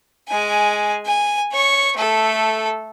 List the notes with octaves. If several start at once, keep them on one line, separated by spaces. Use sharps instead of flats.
G#3 G#5
G#5
C#5 C#6
A3 A4